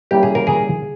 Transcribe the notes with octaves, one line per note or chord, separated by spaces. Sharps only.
G3 A#3 C#4 E4 G4
G#4
A#4
G#4